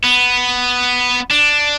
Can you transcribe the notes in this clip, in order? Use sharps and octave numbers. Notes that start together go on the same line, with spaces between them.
B3
D4